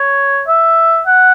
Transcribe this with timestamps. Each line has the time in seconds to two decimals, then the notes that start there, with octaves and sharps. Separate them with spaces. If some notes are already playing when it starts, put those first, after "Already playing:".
Already playing: C#5
0.48 E5
1.07 F#5